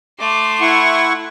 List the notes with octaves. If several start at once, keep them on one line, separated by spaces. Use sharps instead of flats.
A3 C6 D6
E4 F#5 C#6